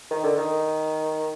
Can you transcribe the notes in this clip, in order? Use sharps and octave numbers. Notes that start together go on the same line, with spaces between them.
D#3
D3
D#3